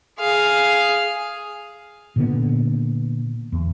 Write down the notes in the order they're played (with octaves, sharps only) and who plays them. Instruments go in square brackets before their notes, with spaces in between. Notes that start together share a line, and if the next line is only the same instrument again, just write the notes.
[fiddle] G#4 F5
[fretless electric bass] A#2 D3 B3
E2